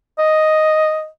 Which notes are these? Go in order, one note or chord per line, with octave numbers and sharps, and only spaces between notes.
D#5